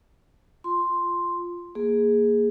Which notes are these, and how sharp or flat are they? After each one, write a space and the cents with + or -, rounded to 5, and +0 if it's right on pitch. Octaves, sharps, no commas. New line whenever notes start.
F4 +0 C6 +0
A#3 +0 G#4 +0